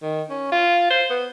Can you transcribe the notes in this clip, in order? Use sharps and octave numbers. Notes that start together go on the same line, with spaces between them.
D#3
C#4
F4
C5
B3